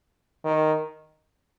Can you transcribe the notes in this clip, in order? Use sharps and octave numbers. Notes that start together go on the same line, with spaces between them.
D#3